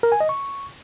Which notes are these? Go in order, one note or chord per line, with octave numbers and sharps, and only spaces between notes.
A#4
G#5
D#5
C#6